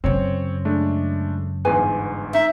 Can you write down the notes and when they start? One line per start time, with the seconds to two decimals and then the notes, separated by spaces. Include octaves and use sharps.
0.04 F#2 C#3 C4 C#5
0.65 G#3 A3 D4
1.65 G1 E2 G#2 G#4 B4 G#5
2.34 D#4 E5